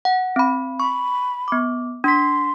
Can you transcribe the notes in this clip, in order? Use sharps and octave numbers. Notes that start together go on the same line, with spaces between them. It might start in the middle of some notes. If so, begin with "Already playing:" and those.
F#5
C4 B5
B5 C#6
B3 D6
D4 C6 B6